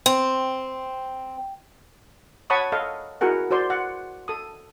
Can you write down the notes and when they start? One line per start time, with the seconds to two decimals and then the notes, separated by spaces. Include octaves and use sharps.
0.06 C4
2.50 C#5 F#5 A5 B5 C#6 D#6
2.72 A4 D#5 F5
3.21 E4 F#4 G#4 A#4 F#5
3.51 F#4 C5 D5 C6
3.70 F#5
4.28 A4 D#6